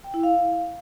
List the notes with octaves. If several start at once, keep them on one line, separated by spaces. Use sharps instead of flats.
G5
E4
F5